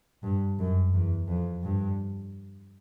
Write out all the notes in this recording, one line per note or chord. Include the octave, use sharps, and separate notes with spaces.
G2
F#2
E2
F2
G2